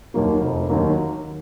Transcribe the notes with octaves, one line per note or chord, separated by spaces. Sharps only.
D#2 D#3 F#3 A#3
F1
D#2 D#3 F#3 A#3